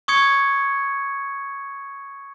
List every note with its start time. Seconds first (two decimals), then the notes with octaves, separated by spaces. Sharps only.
0.08 C#6 D#6 G#6 C#7